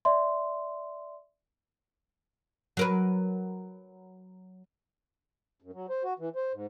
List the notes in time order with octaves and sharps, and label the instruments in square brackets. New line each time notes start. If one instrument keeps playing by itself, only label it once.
[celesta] D5 E5 C6
[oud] F#3 A#4 B4
[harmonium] F#2
F#3
C5
F#4
E3
C5
G#2